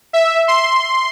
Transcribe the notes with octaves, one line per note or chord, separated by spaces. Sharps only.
E5
C6